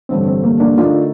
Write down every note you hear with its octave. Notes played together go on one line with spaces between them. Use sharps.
A1 G2 D3 A3 C4
C4
A#3
A#3 D4
D3 A3 D4 D#4 F4 A#4